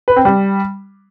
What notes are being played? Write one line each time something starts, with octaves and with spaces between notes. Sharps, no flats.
B4
C4
G3